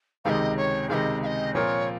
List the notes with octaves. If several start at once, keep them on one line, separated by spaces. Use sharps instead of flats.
C#2 C3 D#3 G#3 D#5 F5
C#5
C#2 C3 D#3 G#3 D#5 F5
F5
D#5
A#2 F3 C4 F4 A#4 C#5